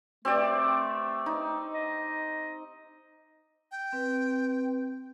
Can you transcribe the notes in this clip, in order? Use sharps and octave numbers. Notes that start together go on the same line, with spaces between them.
A3 C4 G4 D5
D#4
D#5
G5
C4 B4